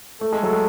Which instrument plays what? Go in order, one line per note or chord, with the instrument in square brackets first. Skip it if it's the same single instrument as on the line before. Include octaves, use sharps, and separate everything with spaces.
[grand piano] A3 [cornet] A4
[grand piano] G#3
F#3
G#3